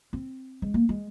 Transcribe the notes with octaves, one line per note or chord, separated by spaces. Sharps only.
C4
G#3
A#3
G#3